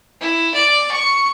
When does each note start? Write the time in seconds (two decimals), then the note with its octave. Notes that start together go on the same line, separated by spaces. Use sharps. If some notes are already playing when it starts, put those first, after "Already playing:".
0.21 E4
0.54 D5
0.91 C#6